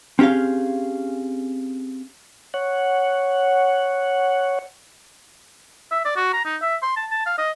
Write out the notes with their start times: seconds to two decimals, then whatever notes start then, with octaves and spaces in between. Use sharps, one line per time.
0.19 C4 C#4 G4 G#4 F5
2.54 C#5 F#5
5.91 E5
6.05 D5
6.16 F#4
6.33 A#5
6.45 D#4
6.62 E5
6.82 C6
6.96 A5
7.11 A5
7.26 F5
7.38 D#5